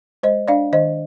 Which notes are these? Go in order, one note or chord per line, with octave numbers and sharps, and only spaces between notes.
G#3 C5 D#5
D4 D5 F5
D#3 C5 D#5